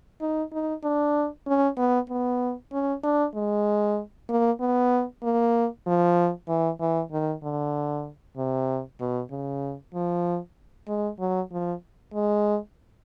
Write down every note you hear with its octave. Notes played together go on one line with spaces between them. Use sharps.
D#4
D#4
D4
C#4
B3
B3
C#4
D4
G#3
A#3
B3
A#3
F3
E3
E3
D#3
D3
C3
B2
C#3
F3
G#3
F#3
F3
G#3